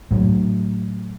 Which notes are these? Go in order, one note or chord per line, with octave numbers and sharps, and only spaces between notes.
A2 F#3